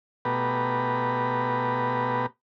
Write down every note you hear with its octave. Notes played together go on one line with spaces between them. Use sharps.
B2 A3 B3 G4 B4 A#5